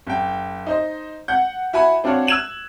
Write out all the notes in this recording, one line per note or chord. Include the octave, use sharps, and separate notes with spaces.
F#1 G5
D#4 C5 D#5
F#5 G6
E4 F#4 G#5 B5
C4 D4 F4 F#4 C#5
E6 F#6 G#6 E7 F#7